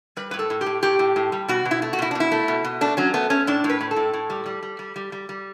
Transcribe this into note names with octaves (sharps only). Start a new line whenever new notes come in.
G3 B4
A2 B4
A4
A2
G4
A2
A2 G4
A2
A2
G3
B2 F#4
B2
E4
A3
F#4
B2 E4
D4
B2 E4
A3
B2
B2
A3 D4
F#3 C#4
A3 B3
A3 C#4
A2 D4
A2
B4
A2
A4
A2
A2
G3
G3
G3
G3
G3
G3
G3